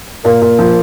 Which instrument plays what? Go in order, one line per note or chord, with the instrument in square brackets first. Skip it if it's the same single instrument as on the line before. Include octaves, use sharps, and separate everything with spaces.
[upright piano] A#2 [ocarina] A#4
[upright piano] A#2
F3